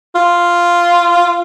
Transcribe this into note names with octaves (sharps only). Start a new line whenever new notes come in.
F4